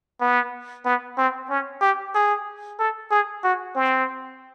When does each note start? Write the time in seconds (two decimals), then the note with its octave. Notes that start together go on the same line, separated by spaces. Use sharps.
0.21 B3
0.85 B3
1.18 C4
1.50 C#4
1.81 G4
2.15 G#4
2.79 A4
3.11 G#4
3.44 F#4
3.76 C4